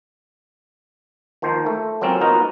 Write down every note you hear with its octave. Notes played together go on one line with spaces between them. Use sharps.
D#3 F3 A#3 C5
A3
F#3 A#3 C4 C#4 F4
A#3 B3 D#4 F4 F#4 A#4